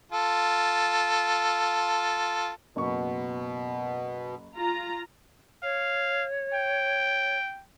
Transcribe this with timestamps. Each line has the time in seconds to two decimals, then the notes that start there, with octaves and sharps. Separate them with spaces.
0.12 F4 A4
2.76 F#1 B2 C#6
4.56 F4 A#5
5.63 C#5 F5
6.53 G5